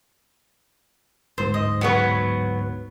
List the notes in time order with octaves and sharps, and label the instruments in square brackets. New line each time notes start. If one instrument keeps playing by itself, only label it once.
[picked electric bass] D1 G#2 [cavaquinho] C5
[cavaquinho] D#5
[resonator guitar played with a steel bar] F#3 B3 [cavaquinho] F#4 C#5 C#6